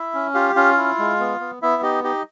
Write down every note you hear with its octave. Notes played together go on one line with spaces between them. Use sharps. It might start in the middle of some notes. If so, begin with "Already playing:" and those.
Already playing: E4 E5
C#4
F4 G4 F5
C#4 F4 F5
E4
G#3
B3
B3
B3 E4 E5
D#4 G4 D#5
D#4 G4 D#5